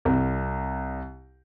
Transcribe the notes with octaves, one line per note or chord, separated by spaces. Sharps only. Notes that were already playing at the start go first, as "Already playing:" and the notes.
C2